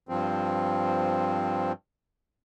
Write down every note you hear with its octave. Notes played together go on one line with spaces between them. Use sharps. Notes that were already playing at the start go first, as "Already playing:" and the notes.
G2 F3 C4